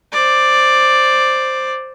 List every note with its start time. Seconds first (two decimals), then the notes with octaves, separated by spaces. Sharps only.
0.12 C5 D5